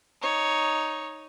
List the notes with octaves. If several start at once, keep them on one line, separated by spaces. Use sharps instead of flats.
D#4 C#5